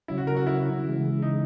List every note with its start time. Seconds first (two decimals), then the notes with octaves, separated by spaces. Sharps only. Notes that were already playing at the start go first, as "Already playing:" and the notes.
0.08 C#3 F#3 C#4 E4
0.17 F#4
0.27 A#4
0.37 F#4
0.47 E4
0.85 C#3 E3 G#3
1.22 D#4